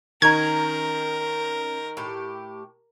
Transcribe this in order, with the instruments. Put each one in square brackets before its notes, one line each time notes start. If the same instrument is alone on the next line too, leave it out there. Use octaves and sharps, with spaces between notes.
[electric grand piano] D#3 D#4 [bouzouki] C#4 A#5 [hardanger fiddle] A#4 [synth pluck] G#6
[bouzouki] A2 G4